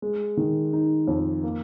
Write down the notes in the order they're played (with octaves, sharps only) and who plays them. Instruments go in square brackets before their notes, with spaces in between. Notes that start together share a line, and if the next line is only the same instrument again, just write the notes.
[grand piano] G#3
D#3
D#4
F2
A#3